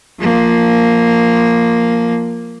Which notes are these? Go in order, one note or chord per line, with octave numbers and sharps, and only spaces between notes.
F3 A#3